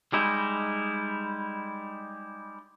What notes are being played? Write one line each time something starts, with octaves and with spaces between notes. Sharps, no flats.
G3 G#3 D#4 E4